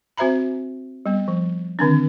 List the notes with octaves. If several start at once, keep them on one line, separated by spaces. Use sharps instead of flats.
C4 F#4 C5 E5 A#5 B5
G3 B3
F3
D3 D#3 C4 D4